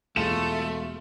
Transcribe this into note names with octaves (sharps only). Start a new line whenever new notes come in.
E1 G#3 A3 F4 G#4 A4 E7